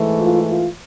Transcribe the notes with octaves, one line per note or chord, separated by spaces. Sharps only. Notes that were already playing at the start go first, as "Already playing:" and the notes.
Already playing: G#2 E3 A3
F4
F4